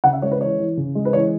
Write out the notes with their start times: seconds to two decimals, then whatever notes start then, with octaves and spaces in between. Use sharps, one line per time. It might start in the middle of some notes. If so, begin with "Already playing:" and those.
0.04 C#3 F#5
0.13 E5
0.22 G#3 C#5
0.31 B4
0.41 E3 C#5
0.59 E3
0.77 C#3
0.95 G#3
1.05 B4
1.13 E3 C#5